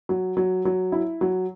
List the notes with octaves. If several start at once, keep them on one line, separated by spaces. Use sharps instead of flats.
F#3
F#3
F#3
E4
F#3